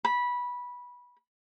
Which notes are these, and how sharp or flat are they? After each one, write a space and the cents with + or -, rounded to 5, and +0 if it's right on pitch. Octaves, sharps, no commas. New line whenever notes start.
B5 -15